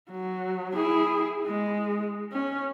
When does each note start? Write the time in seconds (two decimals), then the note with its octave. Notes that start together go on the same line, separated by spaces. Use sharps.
0.11 F#3
0.74 E4 G#4
1.46 G#3
2.32 C#4